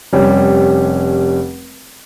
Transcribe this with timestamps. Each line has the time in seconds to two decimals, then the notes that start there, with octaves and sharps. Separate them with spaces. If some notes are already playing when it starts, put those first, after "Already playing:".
0.13 F1 G3 C#4